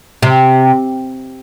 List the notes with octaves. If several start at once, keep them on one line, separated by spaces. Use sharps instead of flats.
C3